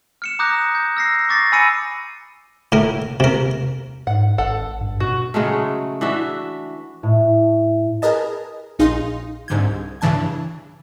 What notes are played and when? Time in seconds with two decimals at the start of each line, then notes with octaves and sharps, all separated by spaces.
0.22 F6 C#7 E7
0.39 A#5 D6 D#6 F#6 G6 A#6
0.75 G6
0.97 E6 A#6 C7
1.29 C#6 D6 A6 A#6 C7
1.52 G#5 B5 E6 A#6 C#7 D#7
2.72 A2 A#4
3.20 C3 A#4
4.07 G#2 F#5
4.38 G#1 A4 F#5
4.81 G2
5.00 B2 F#4
5.34 C#3 F#3 G#3 A3
6.01 E3 D4 F#4 E5
7.03 A2
8.02 G#4 A#4 B4 D#5 A5
8.79 A#1 D#4 G#4 F5 C6 A#6
9.48 C2 G#2 D3 G6 G#6
10.01 G2 C#3 E3 D4 A5 G#6